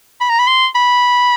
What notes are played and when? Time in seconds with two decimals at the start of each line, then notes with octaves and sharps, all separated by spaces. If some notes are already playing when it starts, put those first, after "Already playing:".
0.21 B5
0.30 A#5
0.39 B5
0.48 C6
0.75 B5